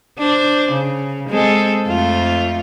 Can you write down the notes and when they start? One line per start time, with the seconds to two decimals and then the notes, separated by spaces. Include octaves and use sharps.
0.19 D4 C5
0.71 C#3
1.29 G#3 C4 A4
1.87 F2 A3 F4